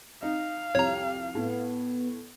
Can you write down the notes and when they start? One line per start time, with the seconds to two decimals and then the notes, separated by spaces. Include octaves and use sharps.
0.23 D#4 F5
0.75 C2 F2 G4 C#5 A#5
1.35 A2 B3